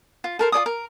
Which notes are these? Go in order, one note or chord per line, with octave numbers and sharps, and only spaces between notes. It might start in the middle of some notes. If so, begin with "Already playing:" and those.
F4
A4 A#4 C5
F4 A4 D5 D#6
A#4